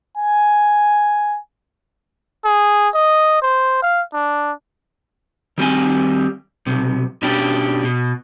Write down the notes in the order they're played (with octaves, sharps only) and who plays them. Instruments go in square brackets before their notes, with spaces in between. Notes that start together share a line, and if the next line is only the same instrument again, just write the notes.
[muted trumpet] G#5
G#4
D#5
C5
F5
D4
[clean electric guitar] D#3 G3 C4 G#5
B1 C3
B2 C#4 D4 G4
B2